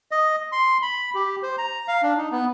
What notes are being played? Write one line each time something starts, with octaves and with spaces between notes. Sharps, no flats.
D#5
C6
B5
G4
C5
A#5
F5
D4
D#4
B3